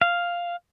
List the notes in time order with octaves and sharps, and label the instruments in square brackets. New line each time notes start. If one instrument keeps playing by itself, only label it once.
[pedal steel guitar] F5